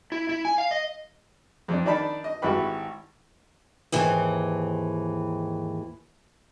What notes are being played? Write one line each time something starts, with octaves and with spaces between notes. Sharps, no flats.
E4
E4
G#5
F5
D#5
F2 D4
D#3 D4 D#4 D5 A5 B5
D#5
G#1 E4 F#4 G4 B4 B5
D#2 G#2 E3